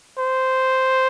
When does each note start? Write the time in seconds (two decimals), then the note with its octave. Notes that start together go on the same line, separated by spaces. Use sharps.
0.18 C5